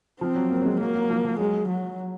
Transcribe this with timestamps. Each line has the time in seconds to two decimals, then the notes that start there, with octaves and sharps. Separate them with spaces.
0.21 F3 C4
0.35 F#3
0.50 A#3
0.61 F#3
0.65 G#3
0.80 F#3 A#3
0.95 F#3
1.10 F3
1.25 F3
1.39 F#3 G#3
1.68 F#3